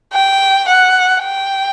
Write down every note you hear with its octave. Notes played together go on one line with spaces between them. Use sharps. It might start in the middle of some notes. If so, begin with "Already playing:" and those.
G5
F#5
G5